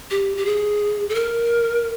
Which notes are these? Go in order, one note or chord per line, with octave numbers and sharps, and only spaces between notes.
G4
G4
G#4
A4
A#4